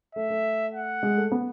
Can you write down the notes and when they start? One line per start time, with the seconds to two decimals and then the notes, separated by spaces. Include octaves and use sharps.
0.15 A3 E5
0.30 A3
0.74 F#5
1.03 G#3
1.17 A3
1.32 B3